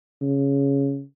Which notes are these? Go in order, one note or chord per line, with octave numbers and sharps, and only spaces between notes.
C#3